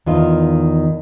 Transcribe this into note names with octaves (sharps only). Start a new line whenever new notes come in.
E2 D#3 F4 D#5